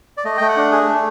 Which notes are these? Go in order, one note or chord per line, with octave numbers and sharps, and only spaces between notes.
D5
A3 D#5
A3 G5
F#5
D4
G#4
A3